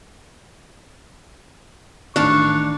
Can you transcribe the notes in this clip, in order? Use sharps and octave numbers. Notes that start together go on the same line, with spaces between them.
A1 D#3 D4 D5 F5 C#6 F#6